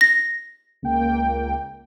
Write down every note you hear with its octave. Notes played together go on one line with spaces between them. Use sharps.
A#6
C#2 A#3 G5